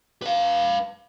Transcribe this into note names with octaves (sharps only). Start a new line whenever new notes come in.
B4 F5